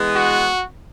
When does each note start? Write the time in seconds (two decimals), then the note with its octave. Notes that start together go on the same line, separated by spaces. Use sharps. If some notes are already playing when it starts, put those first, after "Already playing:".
Already playing: E3 G#3 B3
0.13 F#4